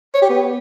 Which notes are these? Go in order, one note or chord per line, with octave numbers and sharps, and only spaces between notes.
C#5
G4
B3